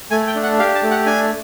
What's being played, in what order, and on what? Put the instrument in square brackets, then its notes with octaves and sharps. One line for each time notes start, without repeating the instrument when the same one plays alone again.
[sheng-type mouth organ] A3 G#5
G5
D4
F#5
G4 F5
A5
A3
F#5
D4 G#5